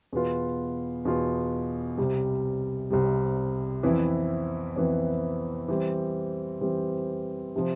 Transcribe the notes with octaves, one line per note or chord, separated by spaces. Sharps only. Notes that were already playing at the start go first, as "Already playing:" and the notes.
E2 B2 B3 F4
E2 B2 B3 F4
C2 C3 G3
C2 C3 G3
F2 E3 B3 E4
F2 E3 B3 E4
E3 G3 C4
E3 G3 C4
C3 F3